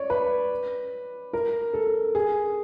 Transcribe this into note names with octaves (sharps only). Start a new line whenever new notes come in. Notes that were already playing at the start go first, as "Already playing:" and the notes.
Already playing: C#5 D5
B4
A#4
A4
G#4